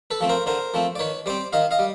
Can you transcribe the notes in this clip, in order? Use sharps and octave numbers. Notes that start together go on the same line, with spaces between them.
A4 B4
F3 A3 C4
A#4 C5
D3 A#4 C5
F3 A3 C4
D5
D#3 B4 C#5
G3 C4 C5 D5
D#3 D#5 F5
D#5 F5
G3